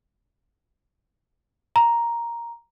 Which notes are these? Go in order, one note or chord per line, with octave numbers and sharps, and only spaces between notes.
A#5